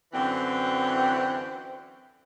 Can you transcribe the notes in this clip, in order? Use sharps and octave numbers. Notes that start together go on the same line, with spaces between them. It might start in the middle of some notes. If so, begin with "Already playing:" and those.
F#2 D3 E3 C4